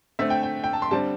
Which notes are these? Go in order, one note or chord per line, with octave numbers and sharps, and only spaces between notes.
D3 A3 C4 E5
G5
G5
G5
A5
C6
D3 G3 C4 A5